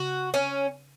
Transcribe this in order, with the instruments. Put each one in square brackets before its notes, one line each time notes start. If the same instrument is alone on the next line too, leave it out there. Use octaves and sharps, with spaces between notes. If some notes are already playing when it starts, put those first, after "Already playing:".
Already playing: [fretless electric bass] C#3 [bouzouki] F#4
[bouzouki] C#4